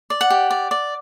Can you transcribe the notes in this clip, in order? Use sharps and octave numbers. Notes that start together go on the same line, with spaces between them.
D5
F#5
G4
D5
D5